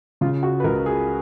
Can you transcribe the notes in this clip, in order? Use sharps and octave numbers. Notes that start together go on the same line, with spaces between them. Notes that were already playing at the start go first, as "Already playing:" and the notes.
C#3 F4
F#4
B4
C#2 A#4
G#4